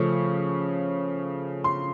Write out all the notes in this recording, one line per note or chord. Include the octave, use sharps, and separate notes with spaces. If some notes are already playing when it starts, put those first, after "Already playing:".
Already playing: C#3 F3 A3 C#4 C#6
C6